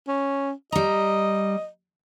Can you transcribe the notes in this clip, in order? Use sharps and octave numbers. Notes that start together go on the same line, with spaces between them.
C#4
G3 D#5 A#5